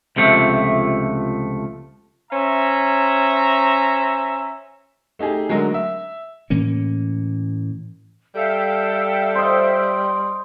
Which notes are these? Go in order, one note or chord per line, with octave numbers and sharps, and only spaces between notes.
C#2 C3 F3 A3
C#4 C5 E5 A#5
A3 D#4 G4 G#4
D3 F#3 G#3 A3 F#4 A#4
E5
A2 E3 A#3 C#4
G3 A4 E5 F5 G5
C5 D#5